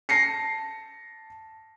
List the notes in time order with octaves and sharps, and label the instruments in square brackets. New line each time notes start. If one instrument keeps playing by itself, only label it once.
[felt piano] A5 A#6 C7 C#7